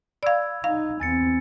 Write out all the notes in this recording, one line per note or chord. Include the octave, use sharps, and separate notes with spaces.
D5 F5 B5 E6 G#6
D#4 F5
E2 C4 G#5 A6 C#7